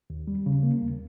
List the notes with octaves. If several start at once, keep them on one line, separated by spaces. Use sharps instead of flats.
D#2
G3
C#3
A#3
D#2